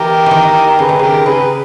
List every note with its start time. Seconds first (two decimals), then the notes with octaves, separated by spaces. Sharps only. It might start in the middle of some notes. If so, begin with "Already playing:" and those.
Already playing: E3 G4 A#4
0.26 D#3 E3
0.78 C#3 G#4 B4
0.89 D#3
0.99 C#3 G4 A#4
1.26 C#3 G#4 B4